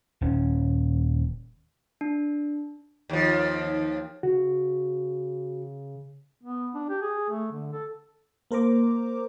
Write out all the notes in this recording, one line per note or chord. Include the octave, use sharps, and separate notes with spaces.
D#1 C#4
D4
D#2 F3
C#3 F#4
B3
D4
G4
G#4
A3
D3
A4
A#3 A#4 C5 A#5 D6